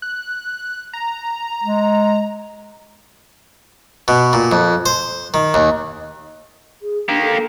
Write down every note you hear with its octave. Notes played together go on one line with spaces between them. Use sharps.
F#6
A#5
G#3
B2
A#2
F2
C5
D#3
D#2
G#4
A#3 D4 G4
A4